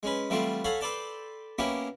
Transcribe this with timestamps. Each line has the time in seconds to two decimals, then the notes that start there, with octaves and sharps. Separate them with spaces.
0.03 G#3 C#4 B4
0.30 E3 G3 A3 C4 F4 F#4
0.64 A4 C#5 F5 F#5 G#5 B5
0.81 A4 B4 C5 D5 G5 A5
1.58 A#3 B3 C#4 E4 F#4 G4